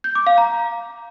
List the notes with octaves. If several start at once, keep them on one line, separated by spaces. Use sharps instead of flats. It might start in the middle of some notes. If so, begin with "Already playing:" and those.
G6
D6
F5
A#5